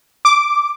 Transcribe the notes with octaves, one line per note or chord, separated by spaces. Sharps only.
D6